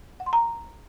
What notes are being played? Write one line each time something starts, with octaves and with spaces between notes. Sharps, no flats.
F#5
C6
A#5